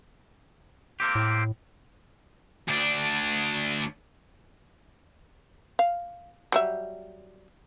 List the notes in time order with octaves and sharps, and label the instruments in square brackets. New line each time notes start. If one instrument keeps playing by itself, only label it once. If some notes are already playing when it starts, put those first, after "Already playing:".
[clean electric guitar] A#3 C4 G4
[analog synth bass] A2
[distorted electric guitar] D2 D4
[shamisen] F5
F#3 G3 E5